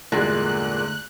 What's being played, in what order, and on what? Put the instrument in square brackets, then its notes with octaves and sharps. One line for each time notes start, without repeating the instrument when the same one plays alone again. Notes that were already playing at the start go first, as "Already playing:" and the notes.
[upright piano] E2 G2 G#3 [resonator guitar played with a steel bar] A#2 [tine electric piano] D3 A3 [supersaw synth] F#6